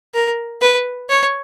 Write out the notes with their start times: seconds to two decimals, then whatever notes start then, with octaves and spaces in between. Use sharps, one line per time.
0.14 A#4
0.61 B4
1.10 C#5